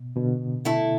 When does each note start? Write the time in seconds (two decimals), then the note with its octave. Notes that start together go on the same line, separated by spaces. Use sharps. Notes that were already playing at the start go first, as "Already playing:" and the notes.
Already playing: B2
0.16 B2 D3
0.65 A3 E4 A4